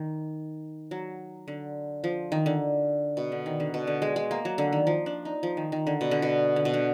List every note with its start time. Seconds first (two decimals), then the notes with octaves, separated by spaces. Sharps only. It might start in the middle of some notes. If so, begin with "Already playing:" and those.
Already playing: D#3
0.91 F#3
1.48 D3
2.04 F3
2.32 D#3
2.46 D3
3.17 B2
3.32 D3
3.46 D#3
3.60 D3
3.74 B2
3.87 D3
4.02 G#3
4.16 G#3
4.31 A#3
4.45 F#3
4.58 D3
4.72 D#3
4.87 F3
5.06 D4
5.25 D#4
5.43 F3
5.57 D#3
5.72 D#3
5.87 D3
6.01 B2
6.11 D3
6.22 B2
6.56 D3
6.65 B2
6.74 D3